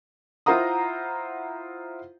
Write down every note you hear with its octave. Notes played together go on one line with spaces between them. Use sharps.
E4 F4 C5 F#5 A#5 D#6